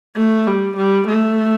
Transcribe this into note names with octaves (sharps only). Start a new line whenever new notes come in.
A3
G3
G3
A3